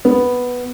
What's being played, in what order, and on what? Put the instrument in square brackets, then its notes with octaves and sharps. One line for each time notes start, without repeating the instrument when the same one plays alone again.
[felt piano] B3